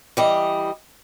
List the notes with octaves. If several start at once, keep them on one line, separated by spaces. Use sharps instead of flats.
E3 G3 D#5